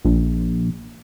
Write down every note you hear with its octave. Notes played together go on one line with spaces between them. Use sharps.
A#1